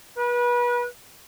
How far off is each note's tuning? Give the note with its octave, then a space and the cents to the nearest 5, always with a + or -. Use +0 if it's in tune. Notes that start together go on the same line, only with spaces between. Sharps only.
B4 -30